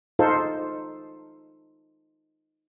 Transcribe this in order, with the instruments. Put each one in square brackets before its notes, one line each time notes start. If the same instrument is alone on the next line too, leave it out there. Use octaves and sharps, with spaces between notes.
[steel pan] D#4 F4 A4 C5